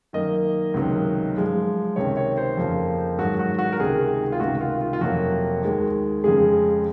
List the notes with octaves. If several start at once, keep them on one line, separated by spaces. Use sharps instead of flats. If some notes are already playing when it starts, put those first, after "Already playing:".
F#2 D#3 A#3 D#5
C#2 C3 D#3 F#3 A#3
F#2 F3 G#3
C#2 C3 D#3 C#5
C#5
C5
F2 C#3 F3 A#3
G#2 D#3 F#3 F#4
F#4
F#4
A#4
C#2 C3 D#3 G#4
F4
C#2 C3 D#3 F#4
F4
F4
F4
F2 C3 F#3 A#3 F#4
D#2 D#3 G#3
F2 C#3 G#3 G#4